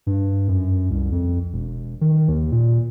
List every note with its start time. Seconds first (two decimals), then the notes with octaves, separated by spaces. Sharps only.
0.07 G2
0.48 F#2
0.90 C2
1.12 F2
1.53 E1
2.01 D#3
2.28 D#2
2.52 A#2